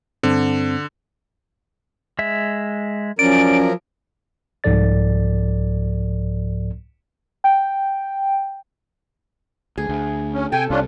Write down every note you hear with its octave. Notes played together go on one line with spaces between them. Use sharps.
G2 D3 C4
G#3 E5
F3 F#3 C#4 A#4 D5 D7
C2 G#2 F3 A4 D5 A6
G5
D2 G#4
D2
C#4
C3 A4 G5 G#5
C2 C3 C#4 D4 F4